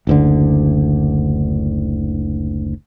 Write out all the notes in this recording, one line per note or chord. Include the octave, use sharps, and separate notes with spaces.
F#1 D2 D3